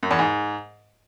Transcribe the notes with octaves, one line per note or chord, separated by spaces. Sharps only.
F#2
E2
G#2